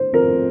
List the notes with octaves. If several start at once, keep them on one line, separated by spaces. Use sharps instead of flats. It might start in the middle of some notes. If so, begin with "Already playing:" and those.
Already playing: C5
F2 A#4